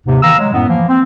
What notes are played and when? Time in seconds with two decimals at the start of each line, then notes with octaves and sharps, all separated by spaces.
0.07 D#2 G#2 C3
0.22 D#3 E3 F5 A#5 E6
0.38 F#3 G#3
0.54 F#2 A2 B3
0.68 E3 F3 A#3
0.88 C4